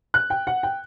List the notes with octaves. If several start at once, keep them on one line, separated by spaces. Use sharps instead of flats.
F#6
G5
F#5
G5